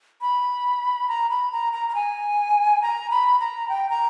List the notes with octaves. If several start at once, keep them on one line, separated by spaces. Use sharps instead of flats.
B5
A#5
B5
A#5
A#5
A#5
G#5
A#5
B5
A#5
G5
A#5